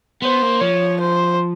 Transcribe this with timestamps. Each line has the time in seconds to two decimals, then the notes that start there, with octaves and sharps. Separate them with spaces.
0.22 B3 C5
0.42 A#3
0.61 F3 C#5
1.00 C5